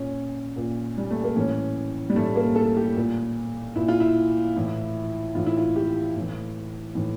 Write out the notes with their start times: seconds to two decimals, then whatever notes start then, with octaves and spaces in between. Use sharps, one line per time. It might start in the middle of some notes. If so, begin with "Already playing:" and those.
Already playing: A#2 C#4
0.56 A#2
0.98 G3
1.11 A3
1.24 A#3
1.36 A2 E3 C#4
2.10 G3
2.16 A2 E3 A3
2.36 A#3
2.56 A4
2.77 G4
2.97 A#2
3.76 A#2 E4
3.88 F4
4.00 E4
4.56 A2 E3
5.35 A2 E3 F4
5.46 E4
5.57 F4
5.76 G4
6.16 A2 E3
6.95 A2 E3